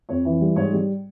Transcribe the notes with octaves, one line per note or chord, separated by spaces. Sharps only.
F2 C#5
E3
G3
G#2 C#5
G3